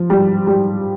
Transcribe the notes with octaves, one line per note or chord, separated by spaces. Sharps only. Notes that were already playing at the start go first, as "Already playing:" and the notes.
Already playing: F3
G3
G3